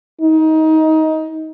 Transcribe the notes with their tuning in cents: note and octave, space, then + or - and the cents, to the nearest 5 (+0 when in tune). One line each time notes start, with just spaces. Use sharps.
D#4 +20